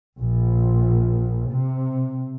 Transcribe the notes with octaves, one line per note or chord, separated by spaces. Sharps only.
A#1
C3